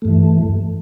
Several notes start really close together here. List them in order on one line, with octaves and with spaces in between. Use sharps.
A3 G2 E3